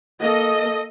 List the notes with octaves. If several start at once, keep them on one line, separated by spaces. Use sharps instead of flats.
A#3 A4 D#5